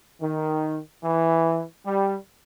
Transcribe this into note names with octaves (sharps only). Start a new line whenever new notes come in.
D#3
E3
G3